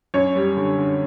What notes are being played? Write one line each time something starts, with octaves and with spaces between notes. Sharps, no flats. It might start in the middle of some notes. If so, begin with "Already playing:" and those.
F#2 C#5
G3
D3
D3